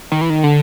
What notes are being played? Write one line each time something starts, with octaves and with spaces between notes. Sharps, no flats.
D#3
E3
D#3
D3